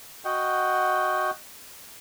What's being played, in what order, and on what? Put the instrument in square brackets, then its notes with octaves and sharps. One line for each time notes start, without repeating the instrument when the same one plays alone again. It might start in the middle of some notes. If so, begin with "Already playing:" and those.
[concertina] F#4 D#5 F#5 G5